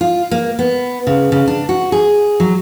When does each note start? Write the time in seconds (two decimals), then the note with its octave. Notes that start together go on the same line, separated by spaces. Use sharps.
0.01 F4
0.31 A#3
0.59 B3
1.07 C#3
1.32 C#3
1.47 D4
1.69 F#4
1.92 G#4
2.40 F#3